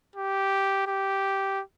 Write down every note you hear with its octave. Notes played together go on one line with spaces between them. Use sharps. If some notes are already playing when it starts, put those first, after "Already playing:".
G4
G4